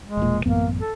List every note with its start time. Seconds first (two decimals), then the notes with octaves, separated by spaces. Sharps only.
0.05 G#3
0.17 E1 A#2
0.46 A1 F#2 A#3 B3
0.80 A4